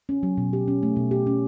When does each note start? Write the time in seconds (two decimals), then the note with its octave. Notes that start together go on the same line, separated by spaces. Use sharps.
0.09 C#4
0.23 F#3
0.38 B2
0.53 G4
0.68 C#4
0.83 A3
0.96 B2
1.11 G4
1.27 C#4